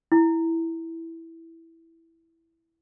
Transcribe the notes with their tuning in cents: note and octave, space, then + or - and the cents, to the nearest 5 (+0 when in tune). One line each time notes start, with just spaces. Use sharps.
E4 +0